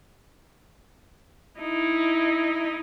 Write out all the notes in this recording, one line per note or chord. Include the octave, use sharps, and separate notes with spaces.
D#4 E4